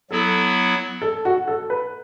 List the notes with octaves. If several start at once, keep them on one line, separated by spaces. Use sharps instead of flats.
F#3 B3 E4 A4
A4
F#4
A4
B4